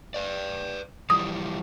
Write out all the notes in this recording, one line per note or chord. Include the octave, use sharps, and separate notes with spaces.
B4 D5
E3 F3 G3 D#6